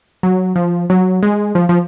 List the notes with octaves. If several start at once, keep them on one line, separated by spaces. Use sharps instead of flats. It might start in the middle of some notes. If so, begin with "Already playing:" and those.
F#3
F3
F#3
G#3
F3
F3